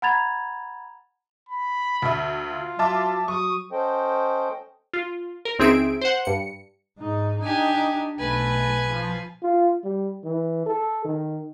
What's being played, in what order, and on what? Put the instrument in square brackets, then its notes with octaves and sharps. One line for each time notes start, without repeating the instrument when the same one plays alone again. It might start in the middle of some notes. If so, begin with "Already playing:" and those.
[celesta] F#5 A#5 B5 G#6 A6 F7
[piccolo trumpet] B5
[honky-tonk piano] D2 E5
[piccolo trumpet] F4
[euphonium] F#3 [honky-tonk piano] E5 A5 D6
[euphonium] F#3 [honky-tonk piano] C#6 [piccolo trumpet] D#6
[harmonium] C#4 A4 C5 D#5 G5
[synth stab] F4
A#4
C#2 C4 D#4 G#4 E5 D7
C5 F#5
G2 C#7
[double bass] G#2 D#4
[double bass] D4 D#4 [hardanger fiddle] G4 G#5
[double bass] B1 A3 [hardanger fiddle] B4 G#5
[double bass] F3
[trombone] F4
G3
E3
A4
D#3